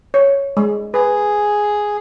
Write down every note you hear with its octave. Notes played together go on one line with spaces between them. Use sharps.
C#5
G#3
G#4 B4